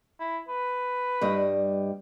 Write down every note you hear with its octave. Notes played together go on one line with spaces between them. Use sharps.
E4
B4
G2 G3 D#5